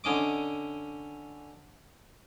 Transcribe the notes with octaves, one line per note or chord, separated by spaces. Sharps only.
D3 C#4 D#5 D6